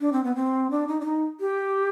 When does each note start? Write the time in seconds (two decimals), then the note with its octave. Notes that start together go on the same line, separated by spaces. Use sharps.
0.01 D4
0.13 C4
0.24 B3
0.36 C4
0.71 D4
0.88 D#4
1.01 D4
1.05 D#4
1.40 G4